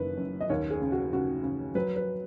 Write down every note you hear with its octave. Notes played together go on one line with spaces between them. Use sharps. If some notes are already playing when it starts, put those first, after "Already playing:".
Already playing: F#1 F#2 D#3 B4
F#2
D#5
D#2 C#5
G#4
C#3
F#4
C#3 F#4
C#3
F#3 B4
B4